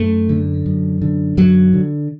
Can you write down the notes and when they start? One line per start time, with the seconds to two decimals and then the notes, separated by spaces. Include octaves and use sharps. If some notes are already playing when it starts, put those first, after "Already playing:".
Already playing: F#2 A3
0.29 D3
0.66 F#2
1.02 D3
1.37 F#2 F#3
1.73 D3